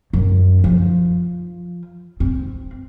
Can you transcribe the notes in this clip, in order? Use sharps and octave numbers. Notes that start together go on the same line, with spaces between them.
F#2
F3
C4